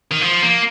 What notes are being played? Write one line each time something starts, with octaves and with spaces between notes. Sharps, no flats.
D#3
F3
A#3